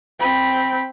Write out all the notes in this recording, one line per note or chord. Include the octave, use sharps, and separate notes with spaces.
C4 B5